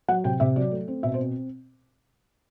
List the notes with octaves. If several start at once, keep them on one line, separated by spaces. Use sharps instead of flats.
F#3 F#5
C3 G5
C3 E5
F#3 D5
A3
C4
B2 E5
C5
C4